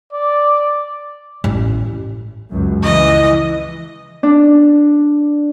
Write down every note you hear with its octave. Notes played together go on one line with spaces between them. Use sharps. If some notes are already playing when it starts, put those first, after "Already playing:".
D5
A1
C#2 F#2
C#2 E3 D#5
D4